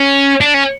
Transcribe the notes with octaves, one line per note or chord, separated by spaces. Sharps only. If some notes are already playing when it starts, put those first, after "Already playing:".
Already playing: C#4
D4
C#4